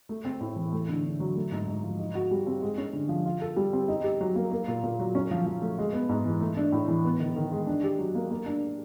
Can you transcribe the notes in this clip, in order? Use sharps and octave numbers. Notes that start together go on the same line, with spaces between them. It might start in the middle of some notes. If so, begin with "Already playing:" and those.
A3
C4
A2
E3
A3
D3
D3
F#3
A3
G#2
G#2
F3
D#4
F#4
G3
C4
G#3
C#4
D3
F3
F4
A4
G3
C4
D#4
G4
F#3
A#3
A#3
A#2
A#2
F#3
C#4
F3
F3
A3
G#3
B3
G#2
E3
A3
D4
A2
E3
B3
D#3
D#3
G#3
D4
G4
F#3
A#3
A#3
D4